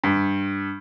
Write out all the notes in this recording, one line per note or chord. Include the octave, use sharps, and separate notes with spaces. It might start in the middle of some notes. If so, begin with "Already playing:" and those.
G2